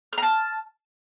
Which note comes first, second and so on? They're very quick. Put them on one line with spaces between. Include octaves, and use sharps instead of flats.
F6 A#5 A5